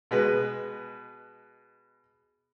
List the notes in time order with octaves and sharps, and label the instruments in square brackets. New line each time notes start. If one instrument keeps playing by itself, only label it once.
[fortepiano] B2 G#3 B4